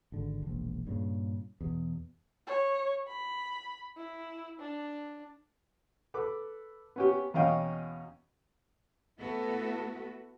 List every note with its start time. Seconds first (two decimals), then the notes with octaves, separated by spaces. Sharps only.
0.12 G#1 D3
0.42 E1 A#1
0.87 G2 A#2 C#3
1.61 E2 B2
2.47 C#5
3.08 B5
3.97 E4
4.60 D4
6.14 A4 B4 D6
6.96 B3 C#4 G4
7.34 E2 B2 C#4 D#5 F5 G5
9.20 A3 B3 E4 F#4 A4 B4